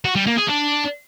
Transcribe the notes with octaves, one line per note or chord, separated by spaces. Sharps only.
F#4
G3
A#3
G#4
D4